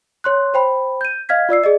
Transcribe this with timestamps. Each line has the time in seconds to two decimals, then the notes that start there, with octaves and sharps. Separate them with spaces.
0.24 C#5 C6 F#6
0.54 C5 G5 B5
1.01 G6 D#7
1.29 D#5 F5 F6 G#6 B6
1.49 F4 D5 E6 C7
1.64 G#4 D5 D#5